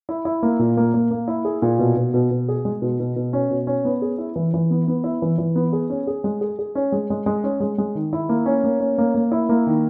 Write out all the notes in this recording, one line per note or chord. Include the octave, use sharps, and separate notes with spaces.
E4
E4
A#3
A#2
A#3
A#3
A#3
E4
G#4
A#2
B2
B2
B2
B2
G#4
G#3
B2
B2
B2
C#4
B2
C#4
B3
G#4
E4
E3
E3
B3
B3
E4
E3
E3
B3
G#4
C#4
G#4
G#3
G#4
G#4
C#4
G#3
G#3
G#3
C#4
G#3
G#3
D#3
E4
A#3
C#4
A#3
C#4
A#3
A#3
E4
A#3
D#3